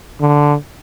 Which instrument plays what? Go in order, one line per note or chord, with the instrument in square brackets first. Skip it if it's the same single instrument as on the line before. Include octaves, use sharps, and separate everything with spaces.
[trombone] D3